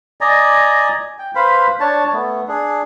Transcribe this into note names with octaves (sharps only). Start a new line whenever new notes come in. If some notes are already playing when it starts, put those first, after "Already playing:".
D5 D#5 G#5 A#5
G5
B4 C5 F5 B5
D4 C#5 A5
A3 B3
D4 G#4